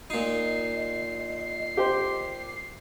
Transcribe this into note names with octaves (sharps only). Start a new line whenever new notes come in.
A#2 D#4 D#5 C7
G4 C5